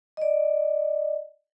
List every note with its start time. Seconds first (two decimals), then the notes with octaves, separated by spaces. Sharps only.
0.17 D5 D#5